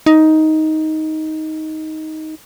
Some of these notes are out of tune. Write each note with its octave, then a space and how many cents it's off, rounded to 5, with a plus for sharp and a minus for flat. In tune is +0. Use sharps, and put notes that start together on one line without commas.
D#4 +10